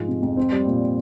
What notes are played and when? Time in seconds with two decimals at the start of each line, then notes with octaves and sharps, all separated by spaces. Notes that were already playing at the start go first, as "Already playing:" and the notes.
Already playing: G#2 F3 G#3
0.08 C3
0.22 F2
0.37 C4
0.52 G3
0.66 A#2